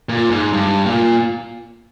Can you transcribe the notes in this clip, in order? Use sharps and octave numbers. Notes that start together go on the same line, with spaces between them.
A#2
G#2
G2
A#2